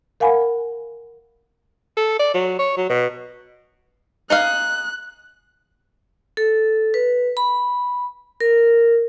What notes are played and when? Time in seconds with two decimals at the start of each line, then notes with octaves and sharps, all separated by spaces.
0.20 A#4 F5 F#5 G#5 B5
1.97 A4
2.19 D5
2.34 F#3
2.59 C#5
2.77 F#3
2.89 B2
4.30 D#4 G#4 F5 F#6
6.37 A4
6.94 B4
7.37 B5
8.41 A#4